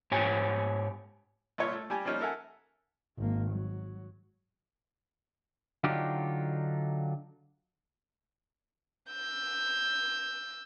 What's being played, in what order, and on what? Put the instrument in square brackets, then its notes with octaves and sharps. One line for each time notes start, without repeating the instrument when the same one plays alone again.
[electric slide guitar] G#2 G4 C#5 G#5
[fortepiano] C2 A#2 F4 C#5
A3
G3 G4 G#5
F3 G3 A#3 C#4 D#4
A4 A#4 E5 F#5 G#5
[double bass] G#1 A#3
F#3
[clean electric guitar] D3 F#3 D4 D#4 F4 G4
[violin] E6 G6